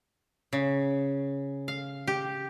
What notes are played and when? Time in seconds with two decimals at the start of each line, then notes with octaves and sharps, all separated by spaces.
0.53 C#3
1.68 F5
2.07 G4